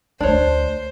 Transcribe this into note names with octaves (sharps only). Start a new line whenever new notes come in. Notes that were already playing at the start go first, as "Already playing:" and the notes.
D2 A3 D4 C5 C#5